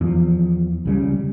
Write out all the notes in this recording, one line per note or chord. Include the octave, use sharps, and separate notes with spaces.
E2 F3
C#2 C#3 G3